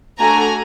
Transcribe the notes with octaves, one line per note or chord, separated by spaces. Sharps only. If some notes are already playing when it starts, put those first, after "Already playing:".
A3 D4 F#4 A4 G#5 A#5